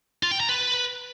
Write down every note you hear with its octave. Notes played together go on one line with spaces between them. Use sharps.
F4
G5
A#5
B4